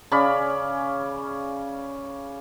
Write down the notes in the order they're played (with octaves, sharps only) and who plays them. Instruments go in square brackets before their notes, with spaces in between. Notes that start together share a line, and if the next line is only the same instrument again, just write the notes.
[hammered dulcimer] C#3 C#4 D5 B5